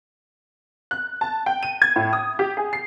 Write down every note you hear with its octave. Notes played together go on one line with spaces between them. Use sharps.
F#6
A5
G5
D#7
G#6
A2
D#6
G4
G#4
C7